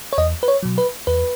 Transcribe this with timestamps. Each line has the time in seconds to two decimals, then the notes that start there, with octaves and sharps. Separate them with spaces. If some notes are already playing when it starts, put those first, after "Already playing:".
0.13 C#5
0.18 E2 D#5
0.43 B4
0.48 C#5
0.63 B2 F#3
0.78 B4
1.07 E2 B4